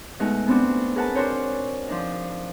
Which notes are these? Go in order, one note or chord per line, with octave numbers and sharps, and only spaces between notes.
B2 G#3 A3 D#4 F#4
B3 C4 D4 F#4
G#4 A#4 B4 F#5 A5
D4 F#4 A#4 C5 C#5
F3 D4 D#4